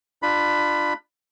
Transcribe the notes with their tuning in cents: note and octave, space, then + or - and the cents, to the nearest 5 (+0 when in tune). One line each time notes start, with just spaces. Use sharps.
D4 +30 F4 +0 B5 +10